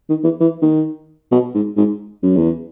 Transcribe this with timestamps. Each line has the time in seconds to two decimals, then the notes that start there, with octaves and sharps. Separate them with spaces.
0.10 D#3
0.24 E3
0.40 E3
0.62 D#3
1.32 B2
1.55 G#2
1.77 G#2
2.23 F#2
2.37 E2